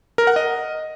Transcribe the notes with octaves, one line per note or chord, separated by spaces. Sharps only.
A#4
F#5
D#5